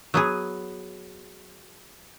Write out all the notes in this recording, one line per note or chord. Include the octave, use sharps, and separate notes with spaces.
F#3 B3 G#4